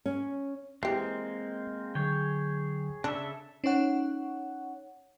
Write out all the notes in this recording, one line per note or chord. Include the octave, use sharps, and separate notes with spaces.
C#4
E3 G#3 A#3 C4 G4 C7
D3 F#3 G#4 C#5 G5
C#3 D4 A4 E5
C#4 D#4 C#5 F#5